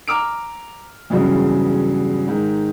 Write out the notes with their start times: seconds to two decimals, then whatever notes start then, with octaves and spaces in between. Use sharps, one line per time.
0.08 A#5 D6 E6 F6 D7
1.10 E2 G2 C#3 F#3
2.28 G#2 D#3